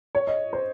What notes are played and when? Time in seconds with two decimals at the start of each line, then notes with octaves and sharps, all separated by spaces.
0.15 C#5
0.27 D#5
0.53 C5